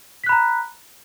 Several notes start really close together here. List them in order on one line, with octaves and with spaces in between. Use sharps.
B6 F#6 B5 A#5